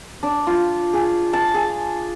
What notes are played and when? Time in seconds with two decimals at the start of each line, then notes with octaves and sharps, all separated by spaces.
0.23 D4
0.47 F4
0.93 G#4
1.33 A5
1.54 G#4